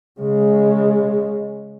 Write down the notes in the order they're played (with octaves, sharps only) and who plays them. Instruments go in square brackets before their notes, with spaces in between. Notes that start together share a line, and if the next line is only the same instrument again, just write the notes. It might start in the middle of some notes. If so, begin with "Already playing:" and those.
[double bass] C#3 G#3